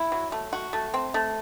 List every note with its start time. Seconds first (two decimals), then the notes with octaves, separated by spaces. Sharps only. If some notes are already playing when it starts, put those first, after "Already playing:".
Already playing: E4
0.12 F#3
0.32 A3
0.53 F#4
0.73 A3
0.94 C4
1.14 A3